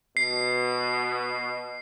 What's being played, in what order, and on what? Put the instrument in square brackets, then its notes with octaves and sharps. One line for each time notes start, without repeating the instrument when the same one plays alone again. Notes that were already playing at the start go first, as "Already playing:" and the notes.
[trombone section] B2 [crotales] C7